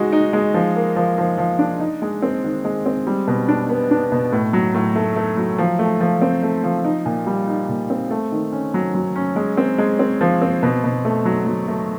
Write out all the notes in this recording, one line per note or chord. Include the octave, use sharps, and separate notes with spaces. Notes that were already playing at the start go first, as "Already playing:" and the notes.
Already playing: G#3 D#4 F#4
D#4
G#3
F3
A#3
F3
F3
F3
D4
D#4
G#3
C4
D#3
G#3
C4
G3
B2
D4
B3
D4
B2
A2
F#3
A2
A3
A3
F#3
F3
A3
F3
C4
A3
F3
D#4
A#2
G3
D#4
A#2
C4
A3
D#3
C#4
F#3
F#3
C#4
G#3
C4
G#3
C4
F3
C4
B2
B2
A3
F#3
F#3
A3